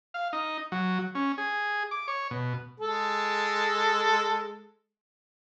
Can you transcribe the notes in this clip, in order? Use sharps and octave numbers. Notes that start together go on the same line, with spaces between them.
F5
D#4
F#3
C#4
G#4
D6
C#5
B2
G#3 A4